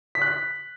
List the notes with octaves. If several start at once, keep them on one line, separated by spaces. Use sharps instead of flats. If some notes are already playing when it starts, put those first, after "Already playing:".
B6
F#6
B6